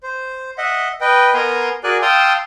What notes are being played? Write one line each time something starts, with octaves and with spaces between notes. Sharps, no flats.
C5
D#5 E5 F#5
B4 D#5 G5
B3 A#4 G#5 A#5 C6
F#4 G#4 A#4 D5 G#5 F#6
F5 G5 A5 C6 D#6 E6